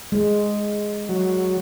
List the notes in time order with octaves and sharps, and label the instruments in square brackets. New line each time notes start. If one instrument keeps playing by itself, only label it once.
[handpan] G#3
[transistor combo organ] F#3